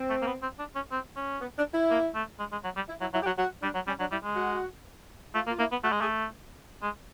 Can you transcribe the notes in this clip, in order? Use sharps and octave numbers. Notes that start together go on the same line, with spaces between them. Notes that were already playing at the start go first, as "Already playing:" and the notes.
Already playing: C4
A3
A#3
B3
C4
D4
C#4
C4
C#4
B3
D4
E4
A#3
A3
G#3
G#3
F#3
G3
E4
F#3 E4
F#3 E4
G4
F#3 F#4
F#3 F#4
G3 D4
F#3
G3 C#4
F#3 D4
G3 E4
G#3
F#4
A3 F4
A#3
F4
A#3 E4
B3
A3 F#4
G#3
A3 G#4
G#3